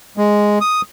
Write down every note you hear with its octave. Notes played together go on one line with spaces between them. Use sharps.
G#3
D#6